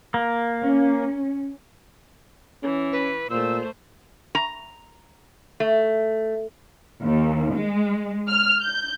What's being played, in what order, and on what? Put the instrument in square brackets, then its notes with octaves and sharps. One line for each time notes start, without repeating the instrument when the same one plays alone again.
[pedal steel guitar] A#3
[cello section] C#4
[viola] E3 [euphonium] C#4
[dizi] B4
[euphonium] A#2 [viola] A3 C5 [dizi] E6
[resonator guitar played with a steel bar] A#5
A3
[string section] D#2
G#3
F6
G6